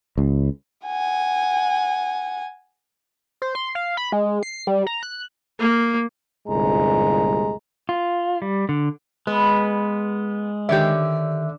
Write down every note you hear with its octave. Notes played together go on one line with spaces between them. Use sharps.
C#2
F#5 G#5
C5
C6
F5
B5
G#3
C7
G3
A#5
F#6
A#3
G1 C2 A#2 G#3 A#5
F4
G3
D3
G#3 B3
D3 D#3 G4 C#5 D5 E5